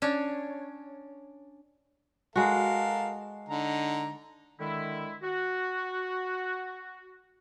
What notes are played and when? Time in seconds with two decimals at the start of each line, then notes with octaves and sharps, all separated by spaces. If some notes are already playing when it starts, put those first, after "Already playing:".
0.02 C#4 D4 C#5
2.36 G#3 F#4 A4 A#4 F5
3.49 D3 D#4 A#5
4.59 D3 D#3 G#3 E4
5.22 F#4